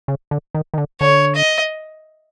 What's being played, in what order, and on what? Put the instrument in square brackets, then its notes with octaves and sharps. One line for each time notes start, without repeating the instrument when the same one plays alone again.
[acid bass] C#3
D3
D#3
D#3
D3
[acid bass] D3 [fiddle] C#5
[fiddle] D#5